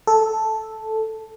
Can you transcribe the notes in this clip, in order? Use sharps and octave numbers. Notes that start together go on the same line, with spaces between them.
A4